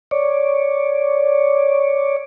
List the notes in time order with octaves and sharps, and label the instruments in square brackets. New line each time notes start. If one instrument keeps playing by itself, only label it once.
[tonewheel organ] C#5 D5